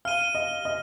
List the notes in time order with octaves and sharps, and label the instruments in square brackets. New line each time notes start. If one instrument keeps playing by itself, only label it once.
[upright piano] F5 [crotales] F6 D#7 G7
[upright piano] D#5
D#5